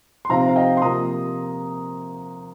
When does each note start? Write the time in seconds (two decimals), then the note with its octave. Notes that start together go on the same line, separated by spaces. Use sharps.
0.25 C6
0.29 C3 F3 C4 D#4 F5 A#5
0.48 F5
0.56 D#5 G5
0.77 C6
0.82 C3 F3 A#3 F4 A#5 D#6